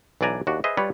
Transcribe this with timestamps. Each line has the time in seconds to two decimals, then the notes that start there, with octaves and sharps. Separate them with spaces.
0.21 B1 E3 D4 D5 G#5 A#5
0.47 D#2 D4 F#4
0.64 G#4 B4 C5 D#5 E5
0.77 G3 F4 B4 C#5 D5